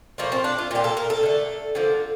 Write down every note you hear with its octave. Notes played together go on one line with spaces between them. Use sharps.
A#2 F3 A3 A#3
C4
D4
F4
A#2 G3 A#3 G4
A4
A#4
A4
D3 A3
D3 F3 A#3